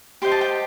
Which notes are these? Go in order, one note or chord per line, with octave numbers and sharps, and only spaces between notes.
G4 C5 D#5 C6
A5
G5